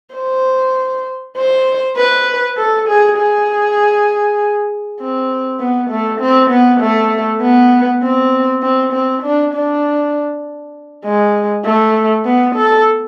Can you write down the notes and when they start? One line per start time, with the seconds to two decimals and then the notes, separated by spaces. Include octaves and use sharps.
0.15 C5
1.37 C5
1.97 B4
2.57 A4
2.88 G#4
3.17 G#4
5.00 C4
5.60 B3
5.90 A3
6.21 C4
6.50 B3
6.80 A3
7.41 B3
8.02 C4
8.62 C4
8.93 C4
9.22 D4
9.54 D4
11.04 G#3
11.65 A3
12.25 B3
12.55 A4